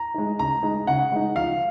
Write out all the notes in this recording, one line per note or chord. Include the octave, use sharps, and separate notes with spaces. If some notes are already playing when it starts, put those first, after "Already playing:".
Already playing: A#5
G#3 D#4
C#3 A#5
G#3 D#4
C#3 F#5
G#3 D#4
F3 F5